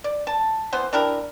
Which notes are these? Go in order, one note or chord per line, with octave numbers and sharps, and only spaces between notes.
D5
A5
E3 B3 C5
D4 E4 G4 A#4